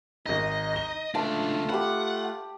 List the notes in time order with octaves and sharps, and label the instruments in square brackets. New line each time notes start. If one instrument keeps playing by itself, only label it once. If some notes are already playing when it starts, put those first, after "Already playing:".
[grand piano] G#1 A#6 [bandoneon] D#4 [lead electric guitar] D#5
[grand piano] A#6 G7
[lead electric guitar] C#2 D4 [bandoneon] A3 F4 [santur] A5
[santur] G4 B5 [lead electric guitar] F#5